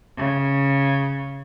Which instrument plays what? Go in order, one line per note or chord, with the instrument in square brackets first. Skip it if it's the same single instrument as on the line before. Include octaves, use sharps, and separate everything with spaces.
[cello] C#3